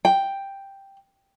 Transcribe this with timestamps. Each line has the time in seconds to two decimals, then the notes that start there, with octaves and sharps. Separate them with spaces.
0.05 G5